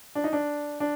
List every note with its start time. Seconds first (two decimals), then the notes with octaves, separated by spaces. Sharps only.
0.15 D4
0.24 D#4
0.33 D4
0.80 D4